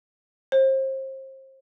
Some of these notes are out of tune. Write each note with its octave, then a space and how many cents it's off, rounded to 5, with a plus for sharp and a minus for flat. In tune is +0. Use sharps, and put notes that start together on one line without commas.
C5 +30